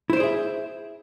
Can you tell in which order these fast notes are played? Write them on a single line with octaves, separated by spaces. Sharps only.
E4 C5 D5 G#4 E5